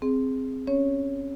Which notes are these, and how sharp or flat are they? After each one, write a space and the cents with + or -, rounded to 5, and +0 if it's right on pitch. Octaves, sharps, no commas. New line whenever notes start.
C4 +0 G#4 +0
C#4 +0 C#5 +0